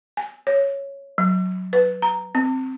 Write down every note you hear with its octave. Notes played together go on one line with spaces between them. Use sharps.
G#5
C#5
F#3
B4
A#5
C4